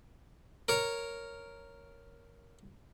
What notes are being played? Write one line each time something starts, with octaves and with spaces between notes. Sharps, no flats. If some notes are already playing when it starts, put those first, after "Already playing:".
A#4 C#5